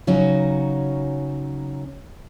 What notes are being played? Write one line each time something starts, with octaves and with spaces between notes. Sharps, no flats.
C#3 F#3 C#4 D#4 F#4